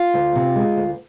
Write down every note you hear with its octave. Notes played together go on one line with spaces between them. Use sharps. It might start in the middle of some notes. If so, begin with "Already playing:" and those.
Already playing: F4
D2
C3
G#3
D2